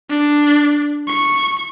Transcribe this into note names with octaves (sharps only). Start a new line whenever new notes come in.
D4
C#6